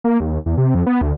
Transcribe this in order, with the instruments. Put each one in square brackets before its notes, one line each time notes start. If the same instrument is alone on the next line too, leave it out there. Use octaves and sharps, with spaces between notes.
[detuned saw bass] A#3
D#2
E2
C3
F2
B3
D2